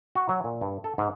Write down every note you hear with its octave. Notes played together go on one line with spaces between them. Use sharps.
F#4
F#3
A#2
G2
A4
G#2